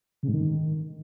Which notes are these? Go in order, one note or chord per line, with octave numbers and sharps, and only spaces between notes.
C#3
G#2
D#3